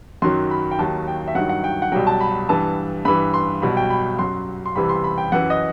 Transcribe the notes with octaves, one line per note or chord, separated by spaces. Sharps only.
F#2 D#3 F#3 C6
B5
G5
D#2 D#3 F#3 A5
G5
E5
G2 D#3 F#3 F#5
F#5
G5
F#5
C2 B2 F#3 G5
A5
B5
G2 E3 A5
G2 E3 B5
C6
C2 B2 F#3 B5
G5
B5
F#2 F#3 C6
C6
C2 C3 E3 B5
C6
B5
G5
F#2 E3 F#5
D#5